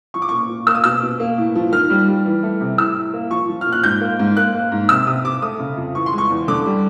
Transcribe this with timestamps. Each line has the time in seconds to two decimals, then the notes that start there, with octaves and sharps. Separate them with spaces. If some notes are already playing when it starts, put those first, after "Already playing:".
0.14 F3 C#6
0.22 D6
0.29 A#2 C#6
0.49 A#2
0.67 A#3 E6
0.75 D#6
0.84 B2 E6
1.02 B2
1.20 A#3
1.38 A2
1.55 F3
1.72 D#3 F6
1.90 G3
2.08 G3
2.25 E3
2.43 A3
2.61 C3
2.78 A2 E6
2.96 A2
3.13 A#3
3.31 F3 C#6
3.48 F3
3.61 F6
3.66 A#2
3.72 F#6
3.84 G#2 G6
4.01 A#3
4.19 G#2
4.37 A#3 F#6
4.55 A#3
4.72 G#2
4.89 C3 E6
5.07 C3 D#6
5.25 C3 D6
5.42 A3 D#6
5.59 C#3
5.77 F2
5.95 E3 C#6
6.06 C6
6.13 G#3
6.18 C#6
6.30 E2
6.48 D3 D6
6.66 G3